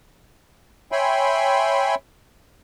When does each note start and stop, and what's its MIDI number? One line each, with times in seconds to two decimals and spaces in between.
0.92 1.95 73
0.92 1.95 76
0.92 1.95 79
0.92 1.95 80
0.92 1.95 83
0.92 1.95 84